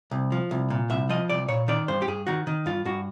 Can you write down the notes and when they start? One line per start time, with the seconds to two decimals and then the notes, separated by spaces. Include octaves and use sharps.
0.11 C2
0.32 F3
0.51 C2
0.70 A#2
0.90 C2 E5
1.09 F3 D#5
1.29 C2 D5
1.48 A#2 C#5
1.68 D#3 D5
1.88 G2 C5
2.02 G4
2.08 G2 G#4
2.27 D#3 F#4
2.47 D#3
2.66 G2 F4
2.85 G2 F#4